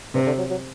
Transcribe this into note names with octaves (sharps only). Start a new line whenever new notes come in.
G2 C3
D3
F#3
F#3